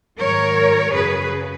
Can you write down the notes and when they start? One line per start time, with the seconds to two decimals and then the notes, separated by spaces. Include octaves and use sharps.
0.19 G#2 D#3 F#3 A#4 C#5
0.92 F#2 C#3 F#3 G#4 B4